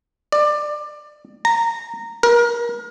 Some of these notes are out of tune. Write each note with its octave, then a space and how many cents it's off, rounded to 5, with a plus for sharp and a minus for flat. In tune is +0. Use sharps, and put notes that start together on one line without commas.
D5 +20
A#5 -15
A#4 +30